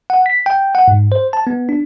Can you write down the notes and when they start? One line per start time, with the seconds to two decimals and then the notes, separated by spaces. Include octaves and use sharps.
0.10 F#5
0.26 B6
0.46 G5
0.75 F#5
0.88 G#2
1.12 C5
1.33 A5
1.47 B3
1.69 D4